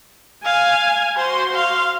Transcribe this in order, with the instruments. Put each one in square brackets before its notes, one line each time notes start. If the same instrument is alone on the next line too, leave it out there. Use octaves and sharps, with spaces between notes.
[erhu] F5 [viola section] G#5
[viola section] F#4 C6 [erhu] C5
[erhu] F5